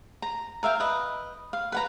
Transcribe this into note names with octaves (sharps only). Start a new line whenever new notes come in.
A#5
A#4 E5 F5 G5
B4 D#5
F5
B4 F#5 A#5